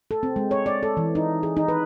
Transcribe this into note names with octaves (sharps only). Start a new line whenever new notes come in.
A4
C4
G#3
C#5
D5
A4
E3
D#4
G#4
D#4
B4